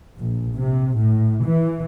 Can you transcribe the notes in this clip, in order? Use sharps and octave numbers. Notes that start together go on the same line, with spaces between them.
A#1
C3
A2
E3